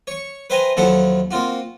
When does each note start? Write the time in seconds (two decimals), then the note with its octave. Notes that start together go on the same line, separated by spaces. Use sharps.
0.07 C#5 C#6
0.50 B4 C5 E5 G5 G#5 A#5
0.77 D#2 F3 F#3 E4 A4 F#5
1.31 A#3 C4 F4 F#4